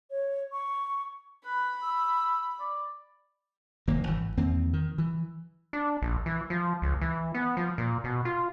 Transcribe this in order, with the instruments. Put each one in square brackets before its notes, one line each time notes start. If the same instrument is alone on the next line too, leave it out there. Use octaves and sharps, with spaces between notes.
[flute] C#5
C#6
[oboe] B4 [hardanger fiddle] B5
[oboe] E6
D5
[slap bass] F1 D#3 A#3
G#1 E3
E2 D#3 A#3 C4
D#3
E3
[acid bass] D4
A#1
E3
F3
C#2
E3
B3
F3
A#2
B2
F4